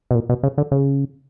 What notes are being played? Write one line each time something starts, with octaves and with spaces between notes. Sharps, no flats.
B2
A#2
B2
C#3
D3
C#3